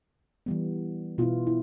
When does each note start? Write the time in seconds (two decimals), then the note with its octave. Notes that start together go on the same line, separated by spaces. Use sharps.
0.46 E3 G3 B3
1.18 B2 B3 E4 F4
1.47 E4